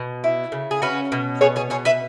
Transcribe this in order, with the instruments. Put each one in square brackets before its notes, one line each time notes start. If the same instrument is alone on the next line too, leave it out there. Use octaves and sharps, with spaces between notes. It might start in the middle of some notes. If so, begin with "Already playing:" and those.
Already playing: [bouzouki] B2
E4
C#3
G#4
C#4 F#4 B4
B2
B3 G#4 C#5
G#4 C#5
B2 G#4 C#5
B4 E5